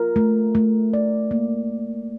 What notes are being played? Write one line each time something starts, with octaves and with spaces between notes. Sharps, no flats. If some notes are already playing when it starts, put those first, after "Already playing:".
Already playing: F4 A#4
A3
A3
D5
A#3